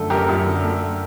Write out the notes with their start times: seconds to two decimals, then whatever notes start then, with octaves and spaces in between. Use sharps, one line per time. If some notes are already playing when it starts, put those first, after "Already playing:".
Already playing: F#2 D3 A3 A4
0.10 F#2 G4 A#4
0.29 F#2
0.46 D3
0.63 A3